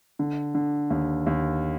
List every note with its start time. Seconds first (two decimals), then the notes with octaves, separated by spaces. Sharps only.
0.19 D3
0.55 D3
0.90 D#2
1.26 D#2